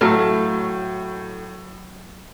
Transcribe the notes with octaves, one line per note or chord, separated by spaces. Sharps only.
A2 F#3 A3 F5